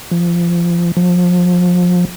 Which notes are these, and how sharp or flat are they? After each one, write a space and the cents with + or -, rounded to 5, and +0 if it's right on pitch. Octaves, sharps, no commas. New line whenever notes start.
F3 -20
F3 +30